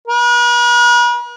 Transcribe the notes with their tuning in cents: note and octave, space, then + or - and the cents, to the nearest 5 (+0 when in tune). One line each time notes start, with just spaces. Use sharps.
B4 -45